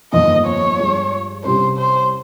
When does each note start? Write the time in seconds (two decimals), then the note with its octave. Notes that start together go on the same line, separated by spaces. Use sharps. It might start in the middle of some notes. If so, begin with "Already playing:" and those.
0.12 G1 F2 D#3 A#3 D#5
0.46 C#5
0.79 G2 F3 G#3
1.44 C2 C3 G3 C#4 C5
1.77 C5